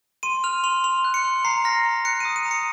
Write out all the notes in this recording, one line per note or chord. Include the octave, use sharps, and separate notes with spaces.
C6 D#7
F6 F7
C6 F7
C6 F7
F#6
C#7
C6
A#5 C7
F6 A#6
A#5
F#6 C#7
D#7
D#6
D#7
A#5
C#7